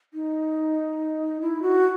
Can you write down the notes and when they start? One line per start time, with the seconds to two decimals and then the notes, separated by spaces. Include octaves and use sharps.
0.14 D#4
1.41 E4
1.62 F#4